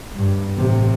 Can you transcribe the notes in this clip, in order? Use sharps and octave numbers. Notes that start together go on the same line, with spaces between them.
G2
A1 C3